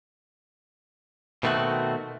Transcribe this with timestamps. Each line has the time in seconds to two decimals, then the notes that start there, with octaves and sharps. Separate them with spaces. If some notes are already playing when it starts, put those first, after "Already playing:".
1.43 B2 D#3 A3 C4 F#4